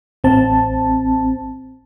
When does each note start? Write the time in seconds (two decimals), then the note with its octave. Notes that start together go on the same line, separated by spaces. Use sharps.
0.24 A1 C4 A5